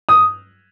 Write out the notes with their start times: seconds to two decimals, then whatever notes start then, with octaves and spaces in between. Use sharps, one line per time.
0.09 D#6